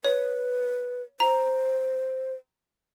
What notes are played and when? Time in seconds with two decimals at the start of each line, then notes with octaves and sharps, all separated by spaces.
0.05 B4 C#5
1.20 C5 A#5